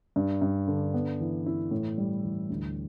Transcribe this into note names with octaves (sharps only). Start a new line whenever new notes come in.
G2
G2
D3
B3
E3
E4
A2
G3
E3
D2